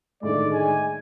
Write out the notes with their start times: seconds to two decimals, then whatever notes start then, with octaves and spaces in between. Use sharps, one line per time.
0.23 A2 D3 D#3 G#3 D5
0.53 G#5